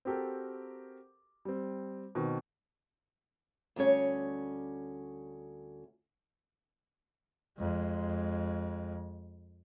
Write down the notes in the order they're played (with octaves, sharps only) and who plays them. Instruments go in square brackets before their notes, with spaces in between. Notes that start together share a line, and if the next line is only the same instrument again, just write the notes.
[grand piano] C4 F#4 G4 A4 A#4
G3 C4
B2 D#3 C4
[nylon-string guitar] D2 G3 C#4 C#5
[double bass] F2 G#3